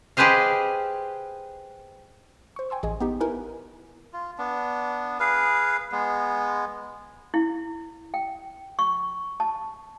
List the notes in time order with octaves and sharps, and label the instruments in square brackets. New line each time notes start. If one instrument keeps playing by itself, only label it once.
[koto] G4 G#4 B4 C5 D#5 F5
[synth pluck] C5 C#6
G5 G#5 C6 E6
A1 G#4 D#5 G#5
B3 D#4 G4
D#4 E4 A#4 B4 G#5
[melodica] F4
B3 D4
G#4 B4 F5
G#3 B3
[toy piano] E4
G5
C#6
A5